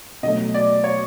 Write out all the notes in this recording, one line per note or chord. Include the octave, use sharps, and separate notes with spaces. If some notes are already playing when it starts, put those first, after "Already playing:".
B2 F#3 A3 D#5
D5
C#5